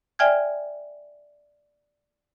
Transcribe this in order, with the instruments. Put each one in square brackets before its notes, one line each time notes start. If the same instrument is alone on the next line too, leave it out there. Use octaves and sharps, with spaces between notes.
[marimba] D5 E5 G5 G#5 F6 G#6